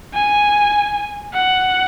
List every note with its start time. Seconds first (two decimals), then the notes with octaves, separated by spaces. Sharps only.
0.14 G#5
1.33 F#5